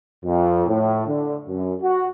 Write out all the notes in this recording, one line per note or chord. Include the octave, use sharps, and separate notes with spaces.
F2
A2
D3
F#2
F#4